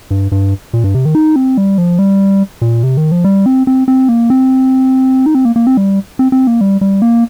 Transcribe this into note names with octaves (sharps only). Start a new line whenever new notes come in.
G2
G2
A#2
G2
C3
D#3
D#4
C4
G3
F3
G3
A#2
C3
D#3
F3
G3
C4
C4
C4
A#3
C4
D#4
C4
A#3
A#3
C4
G3
C4
C4
A#3
G3
G3
A#3